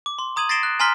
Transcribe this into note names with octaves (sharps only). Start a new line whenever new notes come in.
D6
C6
A#5 D#6 G#6 D#7 F#7
A6 A#6 C7 D7 E7 G7
F#6
G#5 A#5 C6 F6 B6 G7